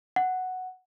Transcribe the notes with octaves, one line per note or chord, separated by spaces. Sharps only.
F#5